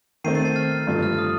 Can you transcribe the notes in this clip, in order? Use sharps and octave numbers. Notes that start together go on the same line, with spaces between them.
D#3 A3 C4 C7 D#7
A6 C7
A6 C7
F6 A6
G2 D3 F3 A3
F6
D#6